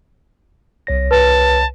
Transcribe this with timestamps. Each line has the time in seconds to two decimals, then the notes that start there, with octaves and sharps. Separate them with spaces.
0.87 C2 C#5 A#6
1.11 B4 A5